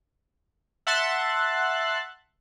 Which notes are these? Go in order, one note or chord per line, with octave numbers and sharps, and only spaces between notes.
E5 F#5 A5 C6 F#6 A6